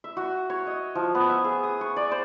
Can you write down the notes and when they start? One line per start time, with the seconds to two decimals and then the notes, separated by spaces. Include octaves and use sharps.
0.04 E5
0.17 F#4
0.50 C#5
0.67 D#5
0.95 F3
1.15 B3
1.29 E5
1.44 G#4
1.64 D#6
1.81 C#6
1.96 D5
2.11 C5